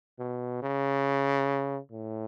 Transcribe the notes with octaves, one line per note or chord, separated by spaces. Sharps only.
B2
C#3
A2